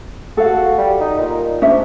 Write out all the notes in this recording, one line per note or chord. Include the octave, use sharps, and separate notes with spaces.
F#4 A4 F5
G3
D#4
A#2
G#2 C#4 D4 E5